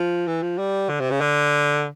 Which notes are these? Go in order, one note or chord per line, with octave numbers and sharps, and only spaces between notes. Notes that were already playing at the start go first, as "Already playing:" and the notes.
Already playing: F3
E3
F3
G3
D3
C3
C#3
D3